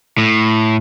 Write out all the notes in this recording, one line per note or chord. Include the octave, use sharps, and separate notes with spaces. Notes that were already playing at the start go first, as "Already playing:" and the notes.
A2